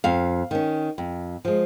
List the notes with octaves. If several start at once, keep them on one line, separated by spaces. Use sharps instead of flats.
F2 F5
D#3 C#4
F2
F3 G#3